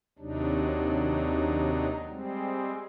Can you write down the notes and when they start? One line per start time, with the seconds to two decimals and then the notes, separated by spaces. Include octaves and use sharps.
0.19 D#2 C3 F#3 D4 D#4
2.08 G3 G#3 C4